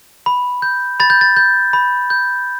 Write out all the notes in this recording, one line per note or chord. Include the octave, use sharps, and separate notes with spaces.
B5
G6
B5 A6
G6
A6
G6
B5
G6